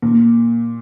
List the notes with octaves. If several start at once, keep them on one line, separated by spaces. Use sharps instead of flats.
A#2